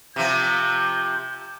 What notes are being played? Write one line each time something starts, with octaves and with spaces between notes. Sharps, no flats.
C3 F3 G6